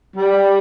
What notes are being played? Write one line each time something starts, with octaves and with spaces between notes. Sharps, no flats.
G3